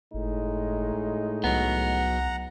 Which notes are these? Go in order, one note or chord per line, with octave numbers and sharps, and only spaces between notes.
G1 A2 G#3 D#4
C2 F#3 B3 F#5 A#5